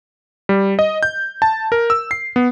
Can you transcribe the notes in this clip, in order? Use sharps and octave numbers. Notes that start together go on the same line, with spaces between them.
G3
D#5
G6
A5
A#4
E6
C7
B3